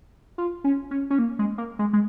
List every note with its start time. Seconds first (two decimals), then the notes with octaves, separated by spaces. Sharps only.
0.38 F4
0.64 C#4
0.91 C#4
1.10 C#4
1.19 A#3
1.39 G#3
1.58 A#3
1.79 G#3
1.93 G#3